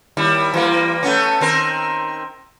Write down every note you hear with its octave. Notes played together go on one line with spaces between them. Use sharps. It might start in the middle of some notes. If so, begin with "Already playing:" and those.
D#2 G3 E4
E3 G3 A#3
A3 B3 C#4
D#3 C4 A#4